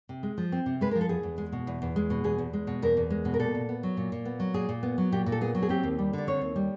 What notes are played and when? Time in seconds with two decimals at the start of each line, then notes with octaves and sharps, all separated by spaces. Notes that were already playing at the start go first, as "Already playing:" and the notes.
0.09 C3
0.23 G#3
0.38 F3
0.52 C4
0.66 C3
0.81 G#3 B4
0.91 A#4
0.96 F3
1.01 A4
1.09 E2 G#4
1.23 E2
1.38 G#3
1.52 B2
1.67 E2
1.82 E2
1.96 G#3
2.10 B2
2.24 E2 G#4
2.38 E2
2.53 G#3
2.67 B2
2.82 E2 A#4
2.97 E2
3.10 G#3
3.25 B2
3.34 A#4
3.39 A#2 A4
3.55 A#2
3.69 B3
3.83 F#3
3.97 A#2
4.12 A#2
4.25 B3
4.40 F#3
4.54 A#2 G#4
4.69 A#2
4.83 B3
4.98 F#3
5.12 A#2 G4
5.26 A#2
5.32 A4
5.41 B3 G#4
5.55 F#3
5.62 G#4
5.69 C4 G4
5.83 D#2
5.99 G3
6.13 D3 D5
6.27 C4 C#5
6.41 D#2
6.56 G3